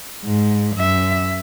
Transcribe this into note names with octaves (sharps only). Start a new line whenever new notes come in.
G#2
F#2 E5